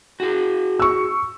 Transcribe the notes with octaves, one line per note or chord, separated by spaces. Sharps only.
F#4 G#4
C#6 E6